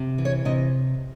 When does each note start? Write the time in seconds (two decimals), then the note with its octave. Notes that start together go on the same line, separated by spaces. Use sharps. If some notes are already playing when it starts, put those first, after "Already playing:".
Already playing: C3
0.18 E3
0.25 C#5
0.45 C3 D#5